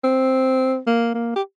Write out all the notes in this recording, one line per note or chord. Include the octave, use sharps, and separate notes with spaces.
C4
A#3
A#3
G4